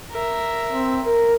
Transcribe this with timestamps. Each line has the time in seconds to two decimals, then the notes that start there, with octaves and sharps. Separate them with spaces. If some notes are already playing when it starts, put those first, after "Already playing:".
0.11 A#4 E5
0.72 C4
1.05 A#4